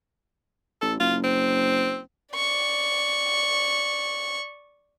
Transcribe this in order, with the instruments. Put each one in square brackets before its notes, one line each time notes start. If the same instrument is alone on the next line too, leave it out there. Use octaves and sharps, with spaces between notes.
[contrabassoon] A1 [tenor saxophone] A4
[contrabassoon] F#1 [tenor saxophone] F4
[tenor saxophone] C4
[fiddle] D5 C#6